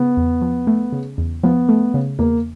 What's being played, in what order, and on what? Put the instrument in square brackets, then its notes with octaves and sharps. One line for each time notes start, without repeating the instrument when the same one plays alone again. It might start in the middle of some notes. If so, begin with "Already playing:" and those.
Already playing: [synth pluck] C#3 [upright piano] B3
[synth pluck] E2
F3
A3
C#3
E2
[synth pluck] F3 [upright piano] B3
[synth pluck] A3
C#3
[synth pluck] E2 [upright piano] A#3